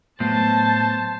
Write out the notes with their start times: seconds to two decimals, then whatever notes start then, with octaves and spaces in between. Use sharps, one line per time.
0.20 A2 F#3 B3 C5 A5